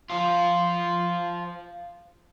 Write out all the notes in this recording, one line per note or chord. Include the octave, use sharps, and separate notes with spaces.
F3 F4